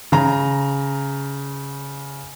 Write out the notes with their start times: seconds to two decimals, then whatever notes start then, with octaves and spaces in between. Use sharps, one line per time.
0.12 C#3 A#5